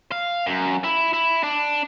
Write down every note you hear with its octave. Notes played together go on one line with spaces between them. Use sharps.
F5
F#2
E4
E4
D4